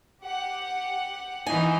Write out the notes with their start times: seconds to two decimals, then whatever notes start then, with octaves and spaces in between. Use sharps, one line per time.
0.22 G4 F#5
1.46 E3 D#4 G#5